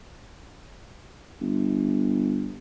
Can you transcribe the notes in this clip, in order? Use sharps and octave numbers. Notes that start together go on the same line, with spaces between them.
G1